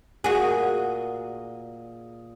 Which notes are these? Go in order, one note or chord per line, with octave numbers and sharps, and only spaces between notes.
A#2 F#4 G#4 D#5